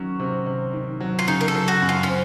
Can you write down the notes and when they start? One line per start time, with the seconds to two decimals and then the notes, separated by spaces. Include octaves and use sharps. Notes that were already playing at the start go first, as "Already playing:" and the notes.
Already playing: D#3 F#3 C#4
0.20 C3
0.46 C3
0.73 D#3
1.01 F#3
1.19 F4
1.27 C#3 D#4
1.41 A#4
1.48 A4
1.55 F#3
1.68 F#4
1.82 F#2
1.89 F4
2.03 C#4
2.09 C4